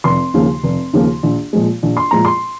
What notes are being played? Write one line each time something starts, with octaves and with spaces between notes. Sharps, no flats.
F1 C6
D#2 C#3 F3 A#3
F1
D#2 C#3 F3 A#3
A#1
A#2 F3 G#3
A#1
C6
A#2 F3 G#3 A#5
C6